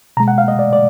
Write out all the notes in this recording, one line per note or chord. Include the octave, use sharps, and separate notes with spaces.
B2 G#3 A#5
F#5
F5
D#5
D5
D5